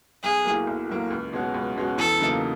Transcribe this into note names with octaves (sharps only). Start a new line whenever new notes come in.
B1 G#4
A2 F#3 A#3
B1
A2 F#3 A#3
C#2
B2 G#3 C#4 F#4
C#2
B2 G#3 C#4 F#4
E2 A4
C#3 F#3 A#3 D#4